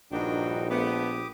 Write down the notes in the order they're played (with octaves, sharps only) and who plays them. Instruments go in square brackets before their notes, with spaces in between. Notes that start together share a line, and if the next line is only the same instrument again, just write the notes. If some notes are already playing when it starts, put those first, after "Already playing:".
[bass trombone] A#1 [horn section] G2 D#3 D4 [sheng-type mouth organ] D#4 F#4 G5
[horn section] A3 B3 [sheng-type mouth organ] G4 D6 D#6